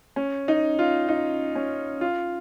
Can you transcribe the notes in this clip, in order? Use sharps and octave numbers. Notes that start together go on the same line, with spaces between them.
C#4
D#4
F4
D#4
C#4
F4